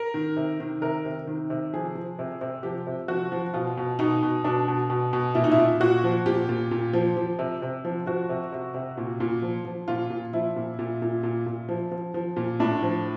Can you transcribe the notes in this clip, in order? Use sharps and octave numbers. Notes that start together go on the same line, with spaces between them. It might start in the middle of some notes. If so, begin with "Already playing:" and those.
Already playing: A#4
D#3
C3
D#3
C3 A#4
C3
D#3
C3
F3 G#4
F3
C3
C3
F3 G4
C3
F3 F#4
F3
B2 F4
B2
B2 D#4
B2
B2 D4
B2
B2
B2
A#2 E4
D#4
E4
A#2
A#2 F#4
F3
A#2 G4
A#2
A#2
F3
F3
C3
C3
F3
F3 F#4
C3
C3
C3
A#2
A#2
F3
F3
A#2 F4
A#2
F3 E4
A#2
A#2
A#2
A#2
A#2
F3
F3
F3
A#2
A2 D4
F3